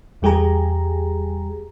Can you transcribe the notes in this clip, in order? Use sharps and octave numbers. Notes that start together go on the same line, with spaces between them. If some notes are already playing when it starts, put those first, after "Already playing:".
E2 G3 G4 G#4 G#5 A#5